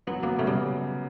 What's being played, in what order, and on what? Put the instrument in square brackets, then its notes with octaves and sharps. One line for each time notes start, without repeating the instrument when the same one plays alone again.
[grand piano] F#3 [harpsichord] B3
[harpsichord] A#3 [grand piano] B3
[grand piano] C#3 [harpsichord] A3
[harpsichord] G3